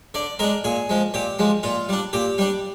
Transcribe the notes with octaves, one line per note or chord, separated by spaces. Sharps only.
D3 D5
G#3 D4 A#4
A#2 G#4
F3 G#3
A#2 G4
F3 G#3
A#2 F4
G3 D4
A#2 G4
G3 D4